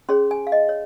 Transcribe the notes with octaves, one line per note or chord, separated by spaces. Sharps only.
C#4 G#4 C#5 C6
G#5
F5
D#5
C#5